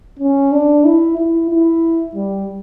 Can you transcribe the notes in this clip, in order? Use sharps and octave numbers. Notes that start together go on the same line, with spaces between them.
C#4
D4
E4
E4
E4
G3